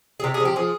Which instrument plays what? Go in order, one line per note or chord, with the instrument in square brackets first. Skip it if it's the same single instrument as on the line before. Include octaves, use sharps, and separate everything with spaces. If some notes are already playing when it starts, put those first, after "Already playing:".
[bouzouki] G#4
C3 G4
G#4
F3
G4
F3 G#4